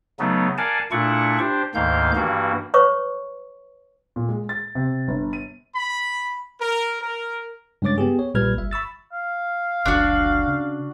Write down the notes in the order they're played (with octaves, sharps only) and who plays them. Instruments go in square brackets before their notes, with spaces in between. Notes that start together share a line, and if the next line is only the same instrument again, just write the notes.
[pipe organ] C#3 F#3 A3 B3 D#4
A#4 D5 F5 F#5 G#5 A5
A#2 A3 D4 E4 F#5 C#6
D4 G4 C5
D2 G#2 D#3 A#3 F5 G6
G2 E3 A#3 F#4
[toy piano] B4 C#5 C#6 D6
[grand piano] A#2
G#3
A6
C3
G1
D#7
[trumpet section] B5
A#4
A#4
[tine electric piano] G2 C#3 G#3 C#5 D6 A6
B3 G4 G#4
C#5
B1 A#2 G3 B4 F6 G#6
G1 E5
B5 C#6 E6 A6
[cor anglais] F5
[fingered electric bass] F#1 C#2 D3 [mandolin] D4 F#4
[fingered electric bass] C#3